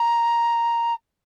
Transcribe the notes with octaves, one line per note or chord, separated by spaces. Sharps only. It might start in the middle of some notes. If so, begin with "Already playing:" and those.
Already playing: A#5